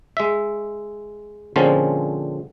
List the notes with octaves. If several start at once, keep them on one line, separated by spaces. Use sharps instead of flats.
G#3 E5
A#2 D3 F3 G#3 C4 C#4